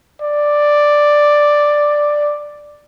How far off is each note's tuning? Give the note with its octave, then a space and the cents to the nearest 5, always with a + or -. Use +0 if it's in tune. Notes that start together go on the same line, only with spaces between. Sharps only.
D5 +5